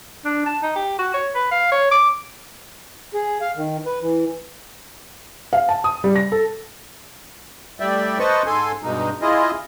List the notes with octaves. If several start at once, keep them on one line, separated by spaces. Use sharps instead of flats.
D4
A5
D#4
G4
F#4
C#5
B4
F5
C#5
D6
G#4
F5
D#3
B4
E3
F5
A5
D#6
G3
A#6
A4
A2 G3 D5 E5 G5
B4 C5 D#5 A5 C#6
G#2 A4 G#5 C6
G2 B2 G#3 D#4
E4 F4 G#4 D#5